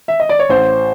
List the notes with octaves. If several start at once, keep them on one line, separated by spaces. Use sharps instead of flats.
E5
D#5
D5
C#5
A1 C5